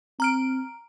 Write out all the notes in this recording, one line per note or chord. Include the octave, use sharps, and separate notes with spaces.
C4 A#5 F6 D7